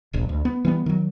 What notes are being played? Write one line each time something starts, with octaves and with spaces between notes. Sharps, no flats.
D1 A#1
D2
B3
E3 G3 B3
D#3 F#3